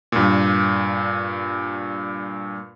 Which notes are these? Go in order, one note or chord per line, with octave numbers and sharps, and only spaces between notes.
G2 A#2